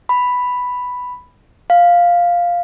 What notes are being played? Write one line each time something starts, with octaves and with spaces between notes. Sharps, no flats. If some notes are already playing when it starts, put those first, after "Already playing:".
B5
F5